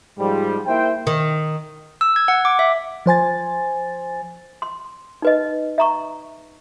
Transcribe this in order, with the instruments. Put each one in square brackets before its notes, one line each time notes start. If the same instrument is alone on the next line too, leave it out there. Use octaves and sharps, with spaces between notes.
[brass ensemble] G#2 F3 G3
A#3 E4 C5 E5 G5
[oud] D#3
[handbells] E6
G#6
F#5
D6
E5
[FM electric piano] F3 C5 G#5 A6
[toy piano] C6
D#4 B4 D#5
E5 A#5 C#6